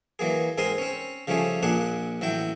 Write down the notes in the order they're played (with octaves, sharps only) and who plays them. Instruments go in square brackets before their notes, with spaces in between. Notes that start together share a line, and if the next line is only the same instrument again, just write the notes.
[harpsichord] E3 F#3 A#3 G#4
G#2 C4 G#4 A#4 C6 D#6
C4 C#4
C#3 F3 G3 A3 C#4 G#4
A#1 A#2 D4 G#4 F#5
A1 F#3 E4 G5